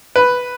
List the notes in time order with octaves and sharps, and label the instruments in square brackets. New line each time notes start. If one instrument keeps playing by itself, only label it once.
[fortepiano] B4